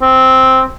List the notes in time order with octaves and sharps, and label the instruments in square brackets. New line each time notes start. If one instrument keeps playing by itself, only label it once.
[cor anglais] C4